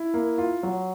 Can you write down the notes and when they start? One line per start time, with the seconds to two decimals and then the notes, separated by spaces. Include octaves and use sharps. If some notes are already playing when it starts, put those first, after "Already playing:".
Already playing: E4
0.14 A#3
0.38 F4
0.63 F#3